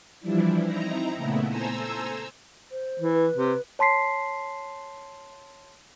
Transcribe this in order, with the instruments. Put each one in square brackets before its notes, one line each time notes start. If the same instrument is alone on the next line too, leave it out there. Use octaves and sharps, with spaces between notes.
[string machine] E3 F3 G3 D4 E4
C4 D#4 E4 A#5
A#2 C#3 A3 B3 E4
A4 C5 G#5 A#5 E6
[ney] C5
[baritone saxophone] E3
[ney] B4
[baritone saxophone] C3
[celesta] C#5 A5 C6 B6 C7